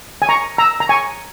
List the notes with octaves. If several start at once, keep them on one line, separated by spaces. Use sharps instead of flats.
G#5
A#5 C#6
A#5 E6
A#5
G#5 C#6